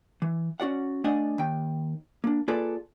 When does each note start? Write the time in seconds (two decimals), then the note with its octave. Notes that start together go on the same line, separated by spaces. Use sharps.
0.22 E3
0.60 C#4 F#4 D5 F#5
1.04 A3 D4 D5 D#5 F#5 G#5
1.38 D#2 G5
2.24 A#3 D4
2.48 A#3 F4 G#4 A4 B4 D5